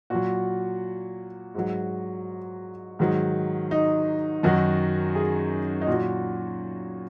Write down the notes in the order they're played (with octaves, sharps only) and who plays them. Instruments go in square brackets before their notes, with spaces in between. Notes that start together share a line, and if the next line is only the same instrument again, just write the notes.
[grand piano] A#2 F#3 F#4
G#2 F#3
G#2 D#3 F#3
D#4
F#2 D#3 F#3 F#4
G#4
D#4
A#2 F#3 F#4